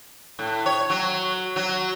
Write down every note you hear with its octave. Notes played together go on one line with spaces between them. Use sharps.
A2
C#5
F#3
F#3